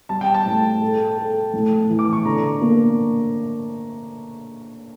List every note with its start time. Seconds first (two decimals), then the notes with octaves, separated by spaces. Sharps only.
0.09 G3 A5
0.21 G5
0.34 A5
0.46 A2
0.81 A4
1.18 A4
1.54 A2
1.90 E3
1.99 D6
2.13 C#6
2.25 D3 A#5
2.61 A#3